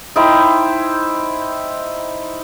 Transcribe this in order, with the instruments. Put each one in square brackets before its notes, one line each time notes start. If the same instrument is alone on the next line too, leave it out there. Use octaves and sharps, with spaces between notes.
[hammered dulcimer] D#4 E4 C5 G5